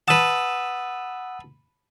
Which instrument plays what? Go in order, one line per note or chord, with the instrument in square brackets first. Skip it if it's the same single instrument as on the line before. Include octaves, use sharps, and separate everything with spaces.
[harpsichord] B4 A5 [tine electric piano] F#5 D#6 E6